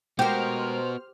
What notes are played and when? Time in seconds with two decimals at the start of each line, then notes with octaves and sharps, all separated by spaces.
0.19 G#3 B3 F#4 G4 A#4 C5 F6